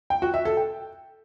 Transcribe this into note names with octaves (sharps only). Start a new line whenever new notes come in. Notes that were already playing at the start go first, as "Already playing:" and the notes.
G5
F#4
E5
A4
G5